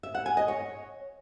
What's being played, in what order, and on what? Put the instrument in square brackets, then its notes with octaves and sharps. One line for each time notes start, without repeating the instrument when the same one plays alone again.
[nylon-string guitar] E5
F#5
G#5
D#5
C#5